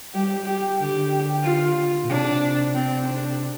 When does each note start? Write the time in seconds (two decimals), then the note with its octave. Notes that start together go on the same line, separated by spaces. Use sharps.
0.14 G3 G4
0.47 G4
0.79 D3 G4
1.44 F4
2.03 A#2
2.09 C3 D4
2.74 C4
3.07 D4